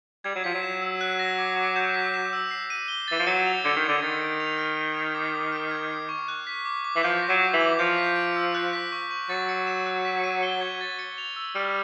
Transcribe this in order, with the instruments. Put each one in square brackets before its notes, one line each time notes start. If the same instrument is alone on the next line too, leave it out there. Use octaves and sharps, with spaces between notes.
[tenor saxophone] G3 [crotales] G#6
[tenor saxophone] F#3
[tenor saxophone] F3 [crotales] B6
[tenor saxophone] F#3
[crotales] E7
E6
F#6
A#6
D6
D6
G6
B6
E7
E6
C7
D#7
G7
[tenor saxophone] E3 [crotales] A6
[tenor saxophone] F3
[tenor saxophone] F#3 [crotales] C#7
[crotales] F7
[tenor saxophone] D3 [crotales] G#6
[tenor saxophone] D#3
[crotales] G#6
[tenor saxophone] D3
[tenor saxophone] D#3 [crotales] A6
[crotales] D7
F7
F6
F6
G#6
D6
D6
F6
G#6
C7
C#6
F#6
B6
D6
D6
[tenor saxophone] E3
[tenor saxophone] F3 [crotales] G6
[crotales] A#6
[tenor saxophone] F#3
[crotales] D6
[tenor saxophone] E3
[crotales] D6
[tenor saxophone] F3 [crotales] G6
[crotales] B6
D7
E6
F#6
B6
C#6
C#6
[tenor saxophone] F#3 [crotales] A6
[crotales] C#7
E7
F#6
B6
D#7
G7
G#6
A6
C#7
F7
E6
[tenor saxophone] G3 [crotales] F6